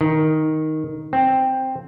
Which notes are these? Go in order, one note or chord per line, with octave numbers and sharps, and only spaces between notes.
D#3
C4